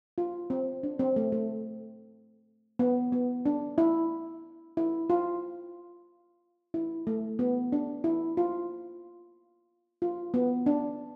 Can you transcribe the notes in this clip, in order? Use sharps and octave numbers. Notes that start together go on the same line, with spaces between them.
F4
C4
D4
C4
A3
A3
B3
B3
D4
E4
E4
F4
E4
A3
B3
D4
E4
F4
F4
B3
D4